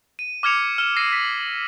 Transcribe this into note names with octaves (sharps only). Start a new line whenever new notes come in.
D#7
D6 F6 G#6 C#7 F7
E6 F6 E7
E6 A#6 C7 D#7
B6 F#7